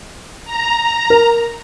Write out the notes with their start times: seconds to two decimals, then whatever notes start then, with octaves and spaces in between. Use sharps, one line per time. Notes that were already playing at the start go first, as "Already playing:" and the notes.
0.45 A#5
1.10 A#4